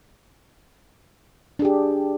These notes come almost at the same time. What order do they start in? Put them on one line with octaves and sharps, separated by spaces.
D4 G#4 G4